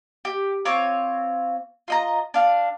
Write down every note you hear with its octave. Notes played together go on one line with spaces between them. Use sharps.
G4
C4 F4 C#5 D6
F4 D#5 A#5
D4 F5